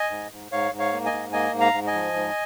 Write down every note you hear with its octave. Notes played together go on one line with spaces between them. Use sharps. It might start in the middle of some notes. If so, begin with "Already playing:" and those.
Already playing: D#5 G#5
G#2
G#2
G#2 C#5 F5
G#2
C#5 F5
A#3
D#5 G#5
G#2
A#3 D#5 G#5
G#2
F5 A#5
G#2
D#5 G#5
F3
G#2